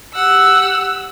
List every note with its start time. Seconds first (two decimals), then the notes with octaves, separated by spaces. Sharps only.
0.14 G4 F#5 E6